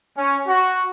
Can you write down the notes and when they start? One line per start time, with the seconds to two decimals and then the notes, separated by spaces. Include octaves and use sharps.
0.17 C#4
0.47 F#4